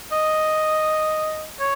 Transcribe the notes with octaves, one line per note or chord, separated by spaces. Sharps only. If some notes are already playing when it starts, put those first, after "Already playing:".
D#5
C#5